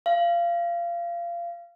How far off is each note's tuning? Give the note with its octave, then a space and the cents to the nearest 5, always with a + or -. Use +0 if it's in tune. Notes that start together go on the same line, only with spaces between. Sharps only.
F5 -25